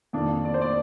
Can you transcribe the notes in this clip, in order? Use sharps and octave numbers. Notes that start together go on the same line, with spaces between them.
F2 D#3 A#3 D4
D5
C5
D5